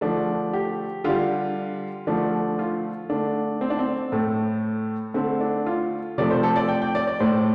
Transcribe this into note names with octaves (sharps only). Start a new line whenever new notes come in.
D3 F3 A3 D4
G4
D3 G3 F4
D3 F3 A3 D4
F4
D3 A3 D4
C4
D4
C4
A2 A3
D3 A3 C4
D4
F4
C3 F3 A3 D5
C5
A4
D5
G5
G5
D5
D5
A2 A3 C5